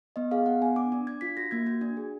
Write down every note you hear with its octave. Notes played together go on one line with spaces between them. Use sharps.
B3 D#5
G#4 F5
B3 F#5
B3 G#5
D4 D6
D4
D4 G#6
F4 B6
F#4 A#6
A#3 G#6
F#4
D4
G#4